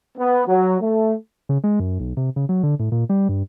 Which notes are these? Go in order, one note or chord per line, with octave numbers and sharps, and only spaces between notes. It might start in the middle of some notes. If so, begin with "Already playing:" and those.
B3
F#3
A3
C#3
G#3
F#2
B1
C3
C#3
F#3
D3
A2
A#2
G3
G2